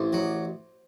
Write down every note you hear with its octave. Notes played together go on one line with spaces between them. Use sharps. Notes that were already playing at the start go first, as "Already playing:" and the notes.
Already playing: A1 C5
F#3